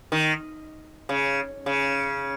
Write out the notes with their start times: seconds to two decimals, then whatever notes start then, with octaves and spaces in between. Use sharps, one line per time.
0.12 D#3
1.09 C#3
1.66 C#3